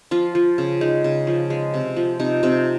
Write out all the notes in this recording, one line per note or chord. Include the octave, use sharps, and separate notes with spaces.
F3 F4
F3
C#3
G#3 D#4
C#3
F3
G#3
C3
F3
C3 D#4
C3 C4